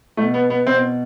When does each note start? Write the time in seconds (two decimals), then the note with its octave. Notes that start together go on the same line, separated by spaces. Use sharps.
0.17 B2 A3
0.34 B3
0.50 B3
0.67 B2 C4